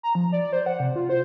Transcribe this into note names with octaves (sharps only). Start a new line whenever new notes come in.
A#5
F3
D5
C5
F#5
C3
F4
C5